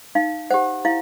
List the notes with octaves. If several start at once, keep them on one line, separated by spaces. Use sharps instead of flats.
D#4 F5
G4 C5 F#5
E4 F5